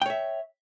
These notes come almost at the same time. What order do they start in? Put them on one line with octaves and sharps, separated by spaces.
G5 C#5 E5